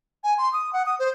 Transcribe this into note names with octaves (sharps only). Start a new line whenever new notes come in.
G#5
C6
D#6
F#5
D#6
C5